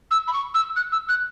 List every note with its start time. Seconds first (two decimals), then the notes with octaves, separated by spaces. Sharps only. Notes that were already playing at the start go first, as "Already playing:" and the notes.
0.10 E6
0.27 B5
0.33 C#6
0.54 E6
0.76 F#6
0.92 E6
1.08 F#6